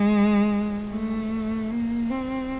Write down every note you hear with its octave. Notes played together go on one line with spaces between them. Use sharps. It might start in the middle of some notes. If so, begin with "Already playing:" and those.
Already playing: G#3
A3
A#3
C4